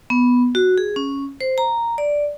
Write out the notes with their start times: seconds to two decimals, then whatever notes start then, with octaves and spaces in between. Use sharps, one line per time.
0.10 B3
0.55 F#4
0.78 G#4
0.96 C#4
1.41 C5
1.58 A#5
1.98 D5